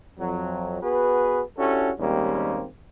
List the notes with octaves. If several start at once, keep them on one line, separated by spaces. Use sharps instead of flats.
F2 F#3
B3 F#4 G#4 B4
C#4 D4 E4 F#4 G4 A4
D#2 G3 G#3 A#3 C4 C#4